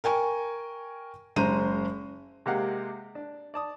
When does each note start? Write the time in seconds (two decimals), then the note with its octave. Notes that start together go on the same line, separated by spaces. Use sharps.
0.04 A#4 G5 G#5 C#6
1.36 F#1 G#3 C5 A#5 D#7
2.46 C3 G#3 A#3 G4 F5 F#5
3.15 D4
3.54 D5 A5 D#6